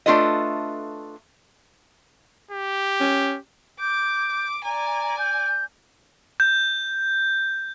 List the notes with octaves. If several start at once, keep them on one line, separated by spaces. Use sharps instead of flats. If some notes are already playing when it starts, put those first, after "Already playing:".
A3 D4 F4 A4 B4 D#5
G4
C#4
D6 G6
D5 G#5 A#5
G6
G6